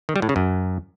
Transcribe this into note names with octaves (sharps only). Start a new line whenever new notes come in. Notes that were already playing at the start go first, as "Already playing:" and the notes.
D#3
G3
A2
C#3
F#2